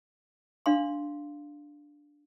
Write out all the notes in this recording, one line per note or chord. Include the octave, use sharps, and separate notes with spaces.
D4 F5 C6